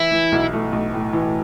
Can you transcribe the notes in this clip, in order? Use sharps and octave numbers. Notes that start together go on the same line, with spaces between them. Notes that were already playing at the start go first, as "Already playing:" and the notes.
Already playing: E3 E4
E3
B1
A3
B1
A2
E3